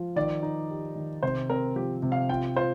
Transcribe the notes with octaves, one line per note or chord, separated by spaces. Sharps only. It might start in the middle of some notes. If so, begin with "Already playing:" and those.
Already playing: F3
D#3 D5
D#4
G4
D#3
C3 C5
C4 A#4
F3 G4
C3
F5
F4 G5
F4 C5